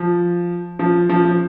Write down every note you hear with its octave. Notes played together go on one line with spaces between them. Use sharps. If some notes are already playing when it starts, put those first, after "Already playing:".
Already playing: F3
F3
F3
F3